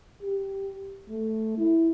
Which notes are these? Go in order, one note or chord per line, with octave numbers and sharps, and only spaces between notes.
G4
A3
E4